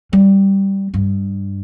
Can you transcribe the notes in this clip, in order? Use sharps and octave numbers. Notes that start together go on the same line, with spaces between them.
G3
G2